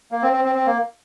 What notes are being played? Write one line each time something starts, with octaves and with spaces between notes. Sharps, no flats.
A#3
C4
C4
C4
C4
A#3